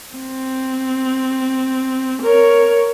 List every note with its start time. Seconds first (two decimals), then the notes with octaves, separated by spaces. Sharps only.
0.15 C4
2.22 A#4 C#5